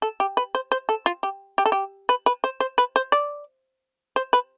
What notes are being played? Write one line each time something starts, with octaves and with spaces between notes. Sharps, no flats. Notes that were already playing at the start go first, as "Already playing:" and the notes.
A4
G4
B4
C5
C5
A4
F4
G4
G4
A4
G4
B4
B4
C5
C5
B4
C5
D5
C5
B4